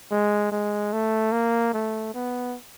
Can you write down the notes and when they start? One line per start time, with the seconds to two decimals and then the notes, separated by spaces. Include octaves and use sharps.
0.11 G#3
0.52 G#3
0.93 A3
1.32 A#3
1.74 A3
2.14 B3